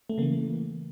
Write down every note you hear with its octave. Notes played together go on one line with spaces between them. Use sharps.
A3
C#3 E3 A#3